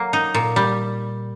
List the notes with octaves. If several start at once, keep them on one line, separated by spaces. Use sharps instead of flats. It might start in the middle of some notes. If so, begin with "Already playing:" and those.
Already playing: F#3 A#3
D#4
A#2
G3